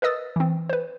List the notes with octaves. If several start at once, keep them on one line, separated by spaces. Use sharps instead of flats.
A#4 B4 D#5 D#6 E6 A6
E3 C4
B4 C5